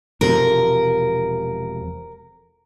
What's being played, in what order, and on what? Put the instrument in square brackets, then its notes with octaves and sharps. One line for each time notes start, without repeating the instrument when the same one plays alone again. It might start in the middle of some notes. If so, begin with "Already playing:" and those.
[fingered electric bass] E1 C3 F3 [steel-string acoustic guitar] A#4